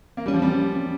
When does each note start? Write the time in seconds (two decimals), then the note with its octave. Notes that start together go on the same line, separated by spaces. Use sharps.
0.17 A#3
0.26 G3 C#4
0.34 F3
0.39 G3 C4
0.51 C#4